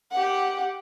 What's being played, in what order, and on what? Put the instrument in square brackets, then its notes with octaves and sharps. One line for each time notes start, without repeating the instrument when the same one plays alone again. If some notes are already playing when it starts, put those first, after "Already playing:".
[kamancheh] G4 F#5